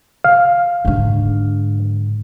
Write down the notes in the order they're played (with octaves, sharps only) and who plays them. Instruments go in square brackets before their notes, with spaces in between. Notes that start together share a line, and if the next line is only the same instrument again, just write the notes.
[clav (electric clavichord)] F5
[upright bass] G#2 D3